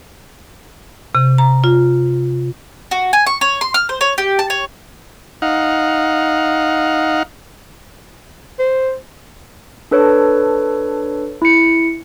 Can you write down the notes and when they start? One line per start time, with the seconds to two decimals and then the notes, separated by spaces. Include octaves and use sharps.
1.15 C3
1.38 A#5
1.64 F4
2.91 F#4
3.13 G#5
3.26 C#6
3.41 C#5
3.61 C6
3.74 F6
3.89 C5
4.01 C#5
4.18 G4
4.39 A5
4.50 C#5
5.42 D#4 F5 F#5
8.59 C5
9.91 D4 A4 B4 C#5
11.42 E4 C#7